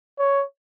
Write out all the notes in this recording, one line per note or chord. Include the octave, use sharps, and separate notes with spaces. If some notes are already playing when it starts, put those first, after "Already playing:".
C#5